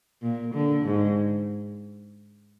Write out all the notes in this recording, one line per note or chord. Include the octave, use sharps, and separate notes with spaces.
A#2
D3
G#2